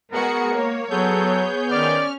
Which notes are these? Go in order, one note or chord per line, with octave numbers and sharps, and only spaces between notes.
G#3 B3 F#4 G#4 A#4 F#5 C#7
A#3 C#5
F#3 B3 G#4 A4 G6
D#3 C#4 D5 F6